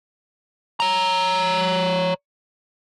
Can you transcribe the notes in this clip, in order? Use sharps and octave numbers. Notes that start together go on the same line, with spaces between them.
C#5 A#5